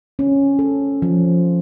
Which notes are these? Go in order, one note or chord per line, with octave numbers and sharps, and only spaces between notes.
C#4
A4
F3